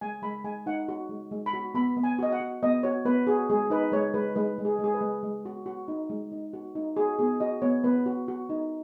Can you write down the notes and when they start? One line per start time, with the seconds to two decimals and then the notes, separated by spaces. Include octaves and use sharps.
0.01 G#3 G#5
0.22 G#3 B5
0.44 G#3 G#5
0.66 D#4 F#5
0.88 F#4
1.09 G#3
1.31 G#3
1.46 B5
1.53 F#4
1.74 B3 B5
1.97 B3
2.03 G#5
2.19 F#4 D#5
2.32 F#5
2.40 F#4
2.63 B3 D#5
2.83 F#4 C#5
3.05 B3 B4
3.27 F#4 G#4
3.50 G#3 G#4
3.70 D#4 B4
3.92 G#3 C#5
4.14 G#3 B4
4.35 G#3 B4
4.58 G#3
4.65 G#4
4.79 G#3
4.84 G#4
4.94 B4
5.01 G#3
5.23 G#3
5.45 F#4
5.66 F#4
5.88 D#4
6.10 G#3
6.32 D#4
6.53 F#4
6.75 D#4
6.97 F#4 G#4
7.19 B3 G#4
7.40 F#4 D#5
7.62 B3 C#5
7.84 B3 B4
8.06 F#4
8.28 F#4
8.49 D#4